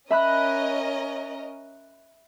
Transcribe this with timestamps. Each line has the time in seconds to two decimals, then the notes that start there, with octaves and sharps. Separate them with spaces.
0.11 C#4 A#4 D#5 E5 B5 F#6